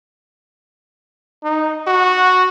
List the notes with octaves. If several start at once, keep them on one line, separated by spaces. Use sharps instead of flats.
D#4
F#4